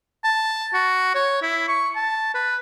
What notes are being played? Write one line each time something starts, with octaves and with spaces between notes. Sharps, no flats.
A5
F#4
C#5
E4
C#6
A5
B4